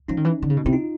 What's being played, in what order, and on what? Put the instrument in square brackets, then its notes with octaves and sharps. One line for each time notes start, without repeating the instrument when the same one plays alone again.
[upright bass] F3 [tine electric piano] C#4 D#4
[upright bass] D#3
E3
D3
C#3
B2
[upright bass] C3 [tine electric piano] E4
[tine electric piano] D#4 F4